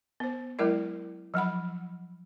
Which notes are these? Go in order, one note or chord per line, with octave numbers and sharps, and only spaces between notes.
B3 C5
F#3 G#3 E4 A#4 D5
F3 F#3 F#5 B5